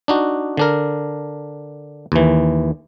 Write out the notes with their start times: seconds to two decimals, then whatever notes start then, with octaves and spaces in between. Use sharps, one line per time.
0.08 D4 D#4 F#4
0.57 D3 D4 A#4
2.12 D#2 E3